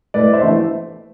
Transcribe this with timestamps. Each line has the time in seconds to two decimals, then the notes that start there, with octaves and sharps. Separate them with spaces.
0.14 A2 B4 D5
0.33 C5 E5
0.43 E3 A3